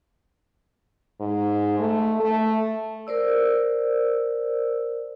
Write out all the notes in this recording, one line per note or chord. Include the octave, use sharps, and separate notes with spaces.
G#2
A3
A3
A#4 C5 D5 E6